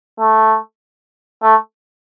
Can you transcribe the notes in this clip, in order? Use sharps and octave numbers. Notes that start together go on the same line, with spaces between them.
A3
A3